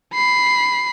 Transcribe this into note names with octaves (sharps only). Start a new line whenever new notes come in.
B5 C7